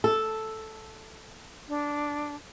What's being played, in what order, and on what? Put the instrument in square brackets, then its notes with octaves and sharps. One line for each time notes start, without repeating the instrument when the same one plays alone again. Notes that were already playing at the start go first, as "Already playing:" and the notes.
[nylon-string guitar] A4
[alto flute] D4